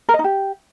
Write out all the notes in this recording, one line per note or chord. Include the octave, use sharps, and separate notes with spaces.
A#4
D#5
D#4
G4